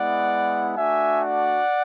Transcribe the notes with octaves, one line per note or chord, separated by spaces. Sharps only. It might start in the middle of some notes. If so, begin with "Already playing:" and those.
Already playing: G#3 B3 E4 D5 F#5
A3 D4 F#4 E5 G#5
D5 F#5